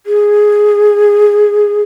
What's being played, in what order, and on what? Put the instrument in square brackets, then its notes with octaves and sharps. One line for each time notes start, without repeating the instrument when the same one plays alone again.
[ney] G#4